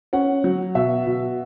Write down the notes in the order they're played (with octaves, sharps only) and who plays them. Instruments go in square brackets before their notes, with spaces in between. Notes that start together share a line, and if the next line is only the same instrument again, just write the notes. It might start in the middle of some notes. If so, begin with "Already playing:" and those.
[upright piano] C#4 F#5
F#3
B2 E5
B2